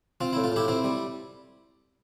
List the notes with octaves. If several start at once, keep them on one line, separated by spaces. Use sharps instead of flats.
C4 F4
E4
A2
F4
A2 E4 G4
C4 E4
G3